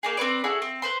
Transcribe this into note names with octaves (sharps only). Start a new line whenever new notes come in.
A#3 D#4 G#4
C4 F#4 B4 D5
E4 F#4 G#4 A4
C4
B4 C5 C6